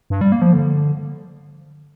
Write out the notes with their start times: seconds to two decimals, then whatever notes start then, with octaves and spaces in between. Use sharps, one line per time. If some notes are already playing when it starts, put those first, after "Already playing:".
0.10 G2
0.21 G3
0.32 A#3
0.42 F3
0.53 D3